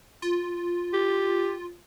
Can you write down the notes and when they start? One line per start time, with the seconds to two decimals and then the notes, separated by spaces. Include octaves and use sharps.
0.22 F4
0.93 G4